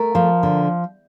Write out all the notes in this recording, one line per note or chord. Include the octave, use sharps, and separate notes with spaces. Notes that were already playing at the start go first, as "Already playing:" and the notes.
Already playing: A3 A#4
F3
D3